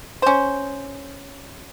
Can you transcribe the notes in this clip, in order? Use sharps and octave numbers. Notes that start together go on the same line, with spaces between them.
C#4 C5